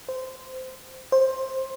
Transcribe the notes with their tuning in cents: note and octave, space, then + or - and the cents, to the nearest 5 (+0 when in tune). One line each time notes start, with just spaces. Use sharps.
C5 -15
C5 +15